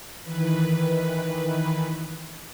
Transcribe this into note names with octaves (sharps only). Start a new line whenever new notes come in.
D#3 E3 B4